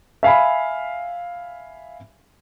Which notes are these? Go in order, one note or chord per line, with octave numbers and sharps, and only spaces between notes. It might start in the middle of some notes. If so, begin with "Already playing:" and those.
E5 F5 G#5 B5